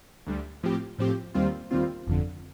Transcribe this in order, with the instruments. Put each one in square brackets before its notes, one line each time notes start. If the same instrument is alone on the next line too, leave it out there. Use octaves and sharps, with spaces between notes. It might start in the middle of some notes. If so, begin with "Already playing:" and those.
[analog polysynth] D2 D3 G3
A2 F3 C4 G4
A2 F3 C4 G4
D#2 D#3 G3 C4 F4
D#2 D#3 G3 C4 F4
G1 F2 D3